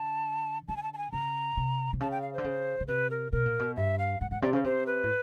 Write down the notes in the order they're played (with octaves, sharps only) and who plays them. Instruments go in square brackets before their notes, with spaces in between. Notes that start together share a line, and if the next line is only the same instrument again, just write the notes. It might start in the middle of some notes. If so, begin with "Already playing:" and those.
Already playing: [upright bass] D3 [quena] A5
[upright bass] D3 [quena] A5
[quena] G#5
A5
A5
G#5
[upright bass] C#3 [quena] A#5
[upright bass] C3
C3
[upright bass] C#3 [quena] A5
[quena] G5
F5
[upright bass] D3 [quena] C5
[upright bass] C#3
C#3
[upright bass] C3 [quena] B4
[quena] A#4
[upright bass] B2 [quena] A#4
[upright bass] A#2
B2
[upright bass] G2 [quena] E5
[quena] F5
[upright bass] G#2 [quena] F#5
[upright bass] G#2 [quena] F#5
[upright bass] C3 [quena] D5
[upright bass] C#3 [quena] C5
[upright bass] C3 [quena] C5
[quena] B4
[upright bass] A2